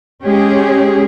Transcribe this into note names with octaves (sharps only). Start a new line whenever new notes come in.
G#3 C#4 G4 G#4